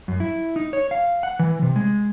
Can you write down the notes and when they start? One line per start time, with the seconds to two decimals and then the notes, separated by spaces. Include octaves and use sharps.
0.08 F#2
0.20 E4
0.56 D#4
0.73 C#5
0.91 F5
1.23 F#5
1.39 E3
1.62 C3
1.76 G#3